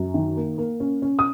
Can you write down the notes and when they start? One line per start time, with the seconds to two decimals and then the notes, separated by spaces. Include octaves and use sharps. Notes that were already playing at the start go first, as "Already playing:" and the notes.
Already playing: F#2
0.14 D#3
0.36 A#3
0.58 A#3
0.80 C#4
1.02 C#4
1.19 D#6